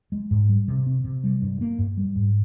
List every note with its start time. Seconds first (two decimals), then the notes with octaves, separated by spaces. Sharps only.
0.12 G#3
0.31 G#2
0.49 G3
0.68 C3
0.86 C4
1.04 C3
1.24 G3
1.42 G2
1.61 A#3
1.78 G2
1.97 G3
2.16 G#2